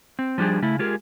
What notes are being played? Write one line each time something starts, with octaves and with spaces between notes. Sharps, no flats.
C4
F3 G3 D4 G4 G#4
C#3 A3 E4
G#3 F4 G4 G#4 A#4